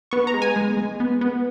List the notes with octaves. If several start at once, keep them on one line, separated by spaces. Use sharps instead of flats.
B3 C#6
A#5
G#3
G#5
G#3
G#3
B3
B3